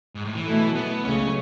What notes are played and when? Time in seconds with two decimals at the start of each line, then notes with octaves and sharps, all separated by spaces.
0.15 G#2
0.25 A2
0.34 E3
0.45 B2 F#3 A3 E4 A4
0.75 B3
1.05 C#2 C#3 F#3 A3 C#4